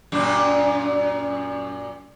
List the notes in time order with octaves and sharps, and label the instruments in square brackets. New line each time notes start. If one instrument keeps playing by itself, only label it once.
[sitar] F#2 A#2 D4